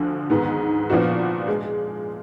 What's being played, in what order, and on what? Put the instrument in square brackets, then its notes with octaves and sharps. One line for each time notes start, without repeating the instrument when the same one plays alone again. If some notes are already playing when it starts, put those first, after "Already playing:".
Already playing: [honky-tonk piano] D2 D3 F3
G#2 D#3 G#3 B3
A#2 F3 B3 D4 F#4
G#3